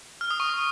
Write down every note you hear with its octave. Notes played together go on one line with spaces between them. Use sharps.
F6
D#6
C#6
D#6